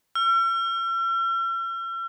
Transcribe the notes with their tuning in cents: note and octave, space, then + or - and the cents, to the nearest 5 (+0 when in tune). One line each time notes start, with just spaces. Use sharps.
E6 +45